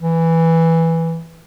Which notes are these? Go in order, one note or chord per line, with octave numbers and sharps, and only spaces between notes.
E3